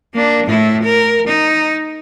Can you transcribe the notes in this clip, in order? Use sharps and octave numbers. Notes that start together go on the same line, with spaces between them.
A#3 D4
A2 E4
A#4
D#4